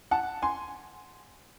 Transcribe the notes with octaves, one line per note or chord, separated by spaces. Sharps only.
F#5 A5
G#5 C6